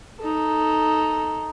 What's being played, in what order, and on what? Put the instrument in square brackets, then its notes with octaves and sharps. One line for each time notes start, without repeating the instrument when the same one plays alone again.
[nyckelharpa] D#4 A4